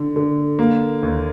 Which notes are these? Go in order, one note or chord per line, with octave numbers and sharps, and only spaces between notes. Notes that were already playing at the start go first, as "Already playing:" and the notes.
Already playing: D3
D3
A#3
D#2